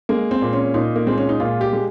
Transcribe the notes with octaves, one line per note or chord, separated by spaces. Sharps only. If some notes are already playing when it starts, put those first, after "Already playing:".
G#3 A#3
C4
A#2
C#4
A#2 D#4
A#3
G#3 C4
C#4
D#4
A#2 F4
G4
G#3